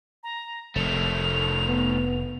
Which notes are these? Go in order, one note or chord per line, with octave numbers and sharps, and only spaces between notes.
A#5
F1 D#3 A3 F7
B3